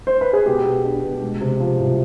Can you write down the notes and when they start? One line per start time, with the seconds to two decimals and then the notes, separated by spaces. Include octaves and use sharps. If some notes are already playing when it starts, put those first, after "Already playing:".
0.07 C5
0.21 B4
0.33 G#4
0.46 B2 G4
0.65 B3
0.85 D4
1.04 B2
1.22 G#3
1.41 C3
1.60 F3
1.79 C2